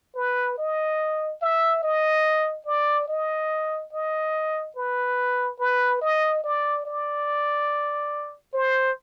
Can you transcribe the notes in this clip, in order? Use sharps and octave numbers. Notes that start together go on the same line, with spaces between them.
B4
D#5
E5
D#5
D5
D#5
D#5
B4
B4
D#5
D5
D5
C5